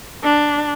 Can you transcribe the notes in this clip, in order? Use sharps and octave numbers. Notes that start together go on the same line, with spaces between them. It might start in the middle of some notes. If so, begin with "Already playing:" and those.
D4